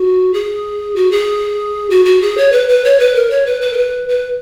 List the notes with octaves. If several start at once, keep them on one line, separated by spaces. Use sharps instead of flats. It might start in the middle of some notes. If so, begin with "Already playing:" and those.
Already playing: F#4
G#4
F#4
G#4
F#4
F#4
G#4
C#5
B4
B4
C#5
B4
A#4
C#5
B4
B4
A#4
B4
B4